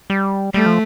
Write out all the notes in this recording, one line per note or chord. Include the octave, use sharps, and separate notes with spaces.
G3
G3 A3
F3